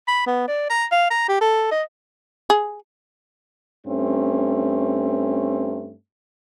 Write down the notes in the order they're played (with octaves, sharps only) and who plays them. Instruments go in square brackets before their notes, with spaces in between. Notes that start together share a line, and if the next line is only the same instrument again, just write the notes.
[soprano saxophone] B5
B3
D5
A#5
F5
A#5
G4
A4
D#5
[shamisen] G#4
[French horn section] G2 A3 C4 C#4